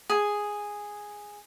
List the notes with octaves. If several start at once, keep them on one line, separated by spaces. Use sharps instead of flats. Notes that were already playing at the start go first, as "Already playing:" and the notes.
G#4